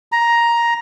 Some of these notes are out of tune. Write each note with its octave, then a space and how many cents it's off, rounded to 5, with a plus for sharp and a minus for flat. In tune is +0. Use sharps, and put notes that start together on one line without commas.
A#5 +10